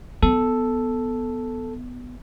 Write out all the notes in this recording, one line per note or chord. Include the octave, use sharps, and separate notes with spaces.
B3 A4